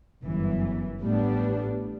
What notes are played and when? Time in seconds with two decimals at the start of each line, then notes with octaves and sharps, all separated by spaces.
0.25 G1 F#2 E3
1.02 A1 A2 G3 B3 D4